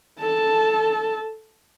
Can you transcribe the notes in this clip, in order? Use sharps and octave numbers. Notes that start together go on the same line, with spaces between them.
A4 A5